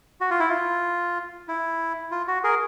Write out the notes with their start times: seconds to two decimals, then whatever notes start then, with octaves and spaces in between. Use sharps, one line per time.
0.21 F#4
0.30 F4
0.40 E4
0.49 F4
1.48 E4
2.11 F4
2.28 F#4
2.44 G#4 A#4